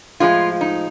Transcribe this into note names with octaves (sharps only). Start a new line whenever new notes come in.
A2 F3 G#3 F4
D#4